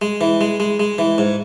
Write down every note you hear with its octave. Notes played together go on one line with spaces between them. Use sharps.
G#3
E3
G#3
G#3
G#3
E3
G#2